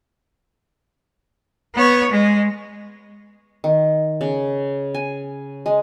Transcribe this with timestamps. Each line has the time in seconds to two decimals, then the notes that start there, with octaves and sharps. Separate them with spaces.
1.75 B3 C#5
2.11 G#3
3.64 D#3
4.21 C#3
4.94 G#5
5.66 G#3